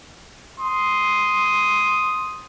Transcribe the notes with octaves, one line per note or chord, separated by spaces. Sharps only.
C6 D#6